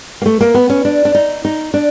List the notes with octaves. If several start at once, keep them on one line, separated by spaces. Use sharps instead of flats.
A#3
A3
A#3
B3
C#4
D4
D4
D#4
D#4
D4